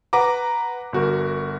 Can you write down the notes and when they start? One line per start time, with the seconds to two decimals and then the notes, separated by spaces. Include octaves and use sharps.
0.13 B4 F#5 A#5 D6
0.93 G1 F#4 A#4